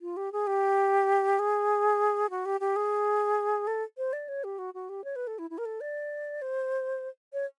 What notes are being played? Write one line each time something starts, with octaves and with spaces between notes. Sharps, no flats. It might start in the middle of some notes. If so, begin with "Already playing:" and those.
F4
G4
G#4
G4
G#4
F#4
G4
G4
G#4
A4
C5
D5
C#5
G4
F#4
F#4
G4
C#5
B4
A4
E4
E4
A#4
A4
D5
C5
C#5